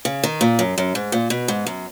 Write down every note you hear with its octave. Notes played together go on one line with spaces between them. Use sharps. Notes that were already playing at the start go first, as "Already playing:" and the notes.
C#3
D#3
A#2
F#2
F#2
G#2
A#2
B2
G#2
F#2